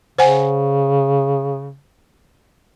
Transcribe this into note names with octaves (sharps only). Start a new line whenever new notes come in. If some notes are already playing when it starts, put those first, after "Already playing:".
C#3 C5 F#5 G#5